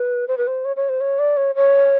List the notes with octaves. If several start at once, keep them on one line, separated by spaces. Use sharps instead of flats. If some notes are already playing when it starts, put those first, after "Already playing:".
Already playing: B4
C5
B4
C5
C#5
C#5
C5
C#5
D5
C#5
C#5